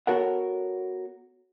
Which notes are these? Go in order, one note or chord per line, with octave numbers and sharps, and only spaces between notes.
B3 F#4 A4 A#4 C#5 F#5